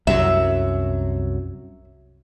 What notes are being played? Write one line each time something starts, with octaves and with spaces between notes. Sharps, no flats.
C2 F#2 F#3 E5